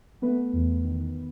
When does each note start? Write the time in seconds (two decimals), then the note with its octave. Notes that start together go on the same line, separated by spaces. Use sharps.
0.22 A3 B3 B4
0.53 E2
0.84 D#3